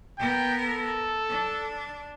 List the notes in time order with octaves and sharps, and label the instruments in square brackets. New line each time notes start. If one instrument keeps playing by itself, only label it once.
[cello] B3 A#4 [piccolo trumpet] G5
[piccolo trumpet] A4
[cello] D4